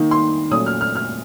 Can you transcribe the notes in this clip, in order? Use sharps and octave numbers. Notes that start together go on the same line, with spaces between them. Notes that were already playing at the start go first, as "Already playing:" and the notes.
Already playing: D#3 A#3 D#4
C6
A#2 F#3 A3 C#4 D#6
F6
F6
F6